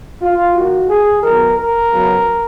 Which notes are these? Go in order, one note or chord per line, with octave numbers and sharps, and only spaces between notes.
F4
D#3 A#3 F#4
G#4
D#3 F#3 B3 A#4
A#4
C#3 F#3 B3